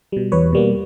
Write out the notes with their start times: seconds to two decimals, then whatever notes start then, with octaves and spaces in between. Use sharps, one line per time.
0.12 B2 G3
0.32 E2 B4 C#5
0.52 B2 G3 A#3